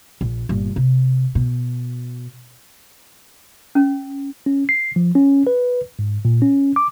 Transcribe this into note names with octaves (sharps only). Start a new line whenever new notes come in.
A#1
G1 A#2
C3
B2
C#4
C#4
C7
F3
C#4
B4
G#2
A#2
C#4
D6